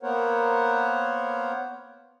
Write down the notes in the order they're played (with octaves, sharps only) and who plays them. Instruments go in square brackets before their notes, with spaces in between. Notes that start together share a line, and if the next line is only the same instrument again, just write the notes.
[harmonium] A#3 B3 A#4 C5 C#5 F#5